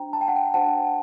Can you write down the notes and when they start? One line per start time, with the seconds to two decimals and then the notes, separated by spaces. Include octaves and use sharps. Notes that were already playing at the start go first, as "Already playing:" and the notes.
Already playing: D4 F#4 C5 G5 A#5
0.13 A5
0.21 G5
0.28 F#5
0.36 G5
0.54 D4 F#4 C5 F#5 A5